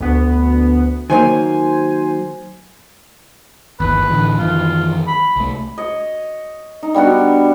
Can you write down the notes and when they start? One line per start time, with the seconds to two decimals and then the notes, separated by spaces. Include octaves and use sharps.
0.01 D2 B3
1.10 D#3 F#3 A#3 C5 G#5
3.80 G1 D#2 B4
4.10 A2 D3 E3
4.38 F#2 D#3 E3 F4
5.07 B5
5.36 C2 A3
5.78 C#5 D#5
6.83 D#4
6.94 G3 B3 D4 F#4